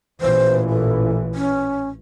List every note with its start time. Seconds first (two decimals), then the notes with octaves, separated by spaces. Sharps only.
0.21 A1 A#2 E3 C5
0.69 A4
1.35 C#4